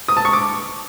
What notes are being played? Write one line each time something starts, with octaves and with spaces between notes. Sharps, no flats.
D#6
A5
C#6
D6